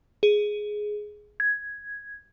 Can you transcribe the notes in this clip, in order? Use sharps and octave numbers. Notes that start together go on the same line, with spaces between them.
G#4
G#6